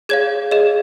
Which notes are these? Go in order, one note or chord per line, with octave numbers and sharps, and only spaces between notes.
G#4 C#5 F5 G#6
G#4 D#5